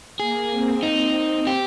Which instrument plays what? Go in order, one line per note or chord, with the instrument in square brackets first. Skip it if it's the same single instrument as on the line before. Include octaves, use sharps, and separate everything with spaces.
[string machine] A#3 [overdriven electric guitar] G#4
[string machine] C4
[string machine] C4 [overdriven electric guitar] D#4
[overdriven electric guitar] G4